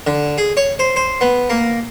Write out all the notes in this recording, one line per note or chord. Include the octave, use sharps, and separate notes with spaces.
D3
G#4
C#5
C5
C5
B3
A#3